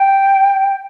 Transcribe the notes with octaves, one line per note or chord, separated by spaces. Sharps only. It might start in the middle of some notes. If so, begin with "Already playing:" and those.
Already playing: G5